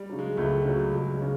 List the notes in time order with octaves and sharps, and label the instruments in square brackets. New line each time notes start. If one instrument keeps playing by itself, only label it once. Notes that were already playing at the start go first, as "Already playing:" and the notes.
Already playing: [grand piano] G3
[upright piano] C#3 F#3
[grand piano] G#3
[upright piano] C#2 [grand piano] A3
[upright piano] C#3 F#3
[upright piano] C#2 [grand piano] G#3
[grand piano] G3
[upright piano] C#3